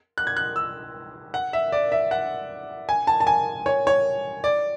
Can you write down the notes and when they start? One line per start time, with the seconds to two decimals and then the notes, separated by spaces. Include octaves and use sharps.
0.18 F#6
0.27 G#6
0.37 F#6
0.56 E6
1.34 F#5
1.53 E5
1.72 D5
1.92 E5
2.11 F#5
2.89 G#5
3.07 A5
3.20 A5
3.27 G#5
3.66 C#5
3.87 C#5
4.44 D5